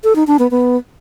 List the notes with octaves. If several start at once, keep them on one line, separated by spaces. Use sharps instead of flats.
A4
D#4
D4
B3
B3